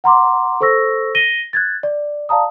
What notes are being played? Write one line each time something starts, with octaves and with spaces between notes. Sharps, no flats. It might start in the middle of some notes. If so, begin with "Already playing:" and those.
F#5 A#5 C6 D6
A4 C5 C#6 E6 A#6
A#6 D#7 G7
F#6 G#6 A6
D5
D5 F5 A5 A#5 D#6